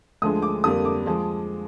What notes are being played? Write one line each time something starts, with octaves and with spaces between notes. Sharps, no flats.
D2 D3 F3 G#3 D#6
D6
F2 D3 G3 A#3 D4 D#6
D6
F3 G#3